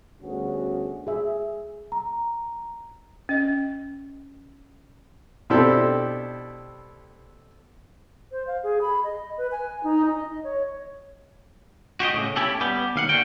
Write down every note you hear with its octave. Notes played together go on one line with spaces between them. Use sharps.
D2 G2 B3 C#4 F#4 G#4
G#4 E5
A#5
C#4 D#5
B2 C4 D4 E4 G4 A4
C5
F5
G#4
B5
D#5
B4
G#5
D#4
D#5
C#5
F#4 G4 C5 D#5
A2 C#3
C#4 E4 G4 A4
G3 B3 G4
D#2 F5 F#5
D3 F#4 G5